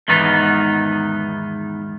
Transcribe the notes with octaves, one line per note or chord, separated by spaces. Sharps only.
E2 G#2 D#3 B3 D#4